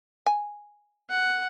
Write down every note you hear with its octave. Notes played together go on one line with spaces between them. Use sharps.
G#5
F#5